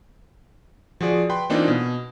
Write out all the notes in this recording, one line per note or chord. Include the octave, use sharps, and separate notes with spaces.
F3 F#4 G#4 D5
B4 G5 B5 C6
E3 A#3 C4 D4 D#4 F4
B2